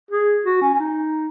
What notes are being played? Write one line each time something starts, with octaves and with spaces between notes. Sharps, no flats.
G#4
F#4
C#4
C#4
D#4